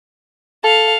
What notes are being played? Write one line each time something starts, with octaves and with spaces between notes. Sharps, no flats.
A4 F5